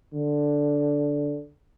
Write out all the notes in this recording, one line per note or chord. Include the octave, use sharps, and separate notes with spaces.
D3